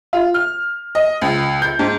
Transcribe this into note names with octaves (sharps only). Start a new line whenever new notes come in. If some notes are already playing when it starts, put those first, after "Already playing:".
F4
F6
D#5
C#2
G6
G#2